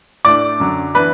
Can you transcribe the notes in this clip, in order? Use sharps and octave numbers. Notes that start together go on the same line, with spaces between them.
A2 A3 D4 D5 D6
F#2 D3 F#3
E3 B3 D4 B4 B5